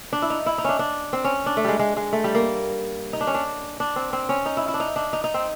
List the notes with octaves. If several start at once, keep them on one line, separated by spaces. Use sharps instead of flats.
D4
E4
D#4
E4
D#4
C#4 D4
D4
C4
C#4
D4
A3
G3 G#3
G#3
G#3
A3
G3
A#3
D#4
D4
C#4
D4
D4
C4
C4
C#4
D#4
E4
E4
D4
D#4
D4
D#4
D#4
C4